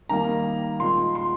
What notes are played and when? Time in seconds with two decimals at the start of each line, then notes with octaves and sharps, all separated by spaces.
0.09 D#3 G3 A#3 A#5
0.80 A#2 G#3 C6
1.15 C6